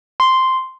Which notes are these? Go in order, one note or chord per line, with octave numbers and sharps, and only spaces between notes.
C6